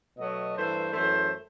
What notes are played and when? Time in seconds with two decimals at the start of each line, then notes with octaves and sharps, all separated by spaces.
0.17 B2 F#3 A3 D#5
0.55 G2 E3 A3 C5
0.93 F#2 E3 A3 C5